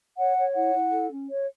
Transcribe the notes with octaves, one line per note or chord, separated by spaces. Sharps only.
C#5 F#5
C#5
E4 F#5
E4
A4
C#4
C#5